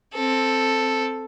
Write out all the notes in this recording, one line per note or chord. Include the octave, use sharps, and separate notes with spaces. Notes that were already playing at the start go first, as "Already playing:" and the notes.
C4 A4